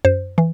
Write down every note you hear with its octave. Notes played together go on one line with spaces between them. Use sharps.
F#2 C5
E3